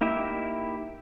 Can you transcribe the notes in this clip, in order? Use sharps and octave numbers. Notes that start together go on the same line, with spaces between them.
A#3 D#4 E4 G4 E5